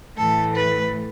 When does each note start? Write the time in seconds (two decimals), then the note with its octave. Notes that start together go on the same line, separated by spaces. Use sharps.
0.16 A2 E3 A3 A4
0.56 B4